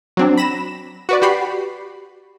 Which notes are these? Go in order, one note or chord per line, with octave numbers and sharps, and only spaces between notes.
F#3 C4 D4
B5 A#6 E7
F#4 B4 D5
F#4 G4 B5 C7